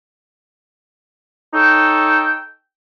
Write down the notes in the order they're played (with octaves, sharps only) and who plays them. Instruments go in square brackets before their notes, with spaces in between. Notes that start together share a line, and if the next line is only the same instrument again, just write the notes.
[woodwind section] D#4 A4 C#5 G5